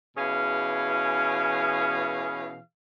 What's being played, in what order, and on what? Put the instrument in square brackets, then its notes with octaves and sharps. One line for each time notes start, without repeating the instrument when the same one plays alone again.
[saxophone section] B2 E3 C#4 G#4 F5